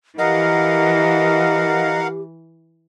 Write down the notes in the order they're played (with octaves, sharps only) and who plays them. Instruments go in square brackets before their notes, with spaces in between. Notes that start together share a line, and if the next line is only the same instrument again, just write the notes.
[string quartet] E3 [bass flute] G4 [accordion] A#4 F5 F#5 [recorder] D#5